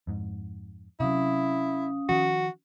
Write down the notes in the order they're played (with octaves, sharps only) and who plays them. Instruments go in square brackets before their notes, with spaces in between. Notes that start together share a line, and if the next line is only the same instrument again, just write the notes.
[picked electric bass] F2 G#2
[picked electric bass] C3 F#3 [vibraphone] C#4 F5 D#6 [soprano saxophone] E4
[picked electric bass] D#3 F3 [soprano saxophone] F#4